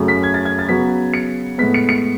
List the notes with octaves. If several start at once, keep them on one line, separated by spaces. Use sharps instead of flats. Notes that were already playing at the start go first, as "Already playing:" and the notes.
Already playing: F#2 C#3 F#3 A3
B6
G#6
A6
G#6
A6
C#3 F#3 B3 B6
C#7
A2 G#3 B3 B6
C#7
C#7